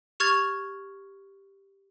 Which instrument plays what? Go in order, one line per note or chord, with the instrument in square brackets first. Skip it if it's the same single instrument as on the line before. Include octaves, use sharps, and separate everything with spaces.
[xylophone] G4 C#6 F6 G#6 A6 F7